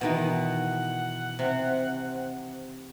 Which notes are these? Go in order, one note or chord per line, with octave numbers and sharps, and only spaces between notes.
B2 D#3 E3 F#5
C3